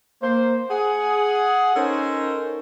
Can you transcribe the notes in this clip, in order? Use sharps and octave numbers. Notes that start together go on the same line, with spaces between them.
A#3 C5
G#4 F#5
C#4 D#4 A4 A#4 C5 C#5